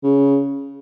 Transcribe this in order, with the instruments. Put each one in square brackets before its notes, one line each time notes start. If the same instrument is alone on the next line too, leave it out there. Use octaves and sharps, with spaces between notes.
[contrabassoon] C#3